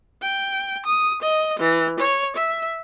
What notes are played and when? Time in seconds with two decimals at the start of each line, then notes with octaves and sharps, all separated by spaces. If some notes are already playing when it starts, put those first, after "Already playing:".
0.21 G5
0.86 D#6
1.22 D#5
1.58 E3
1.99 C#5
2.36 E5